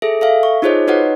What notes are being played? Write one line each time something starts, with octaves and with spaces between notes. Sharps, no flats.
G#4 A4 E5
A4 E5 F5
C#6
D#4 F4 G#4 C5 C#5 D#5
D#4 F#4 B4 C#5 D#5 F#5